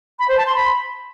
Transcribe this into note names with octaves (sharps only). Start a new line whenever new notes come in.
B5
C5
A5
C6
B5